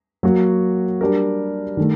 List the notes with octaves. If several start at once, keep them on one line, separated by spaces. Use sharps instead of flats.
F#3 A#3 F#4
G3 D4 G4 A#4
D#3 A3